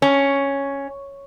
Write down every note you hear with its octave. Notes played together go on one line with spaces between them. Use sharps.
C#4